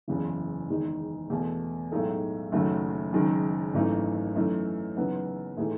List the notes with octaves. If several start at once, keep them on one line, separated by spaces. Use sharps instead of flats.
F#1 E2 C#3 E3
F#1 E2 D#3 G#3 D#4
E1 E2 B2 A3
B1 A2 G#3 D#4 A4
F#1 F#2 D#3 F#3 A3
F#1 F#2 D#3 G#3
G#1 F#2 E3 A3 D#4
F#2 E3 A3 D#4
F#1 F#2 E3 B3 D#4
A2 E3 A3 D#4 G#4